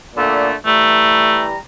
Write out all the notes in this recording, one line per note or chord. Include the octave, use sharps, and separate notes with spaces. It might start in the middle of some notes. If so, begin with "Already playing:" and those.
A#2 D3 A3
E3 G3 A3 A#5